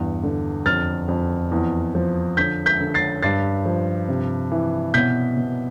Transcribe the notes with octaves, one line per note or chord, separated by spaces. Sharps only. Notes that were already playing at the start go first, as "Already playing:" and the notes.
Already playing: E2 G2
D3
F2 F6 A6
F2
E2
F3
D3 G6 B6
G6 B6
D3
A6 C7
G2 A6 C7
F3
C3
E3
B2 G6 B6
B2